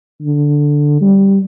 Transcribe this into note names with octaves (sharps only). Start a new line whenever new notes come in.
D3
G3